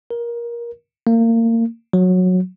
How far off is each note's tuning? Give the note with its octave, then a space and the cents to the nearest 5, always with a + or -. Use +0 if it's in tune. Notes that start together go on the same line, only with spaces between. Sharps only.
A#4 +20
A#3 -30
F#3 -15